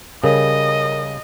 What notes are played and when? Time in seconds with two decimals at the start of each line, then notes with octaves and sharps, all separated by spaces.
0.24 C#3 G3 A#4 D#5